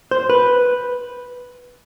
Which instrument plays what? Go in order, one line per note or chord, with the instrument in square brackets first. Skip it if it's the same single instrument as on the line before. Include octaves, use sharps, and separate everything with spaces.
[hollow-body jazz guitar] C5
B4